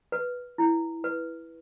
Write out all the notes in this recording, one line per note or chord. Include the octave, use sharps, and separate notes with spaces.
B4
E4
B4